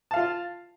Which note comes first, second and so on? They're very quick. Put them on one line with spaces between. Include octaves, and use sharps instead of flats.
A5 F5 F4